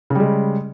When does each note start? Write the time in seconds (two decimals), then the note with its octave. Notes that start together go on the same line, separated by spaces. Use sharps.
0.10 C#3
0.15 G3
0.20 G#3